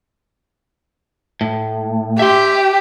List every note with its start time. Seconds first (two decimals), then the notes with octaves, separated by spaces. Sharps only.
1.41 A2
2.19 G4 E5 C6